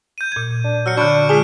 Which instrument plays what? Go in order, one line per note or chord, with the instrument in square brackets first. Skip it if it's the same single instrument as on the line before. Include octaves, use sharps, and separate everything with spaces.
[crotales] G6 D#7
[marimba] A#2 G#6
[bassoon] D4
[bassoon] F#3 [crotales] E6 F6 C#7
[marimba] D3 B5 [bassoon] D4 [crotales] C#6 G6 D7
[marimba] G#3 F4 A5 [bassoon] G#4 [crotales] D6 F6